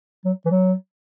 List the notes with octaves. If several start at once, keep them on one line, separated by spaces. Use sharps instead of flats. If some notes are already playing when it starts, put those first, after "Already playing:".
F#3
E3
F#3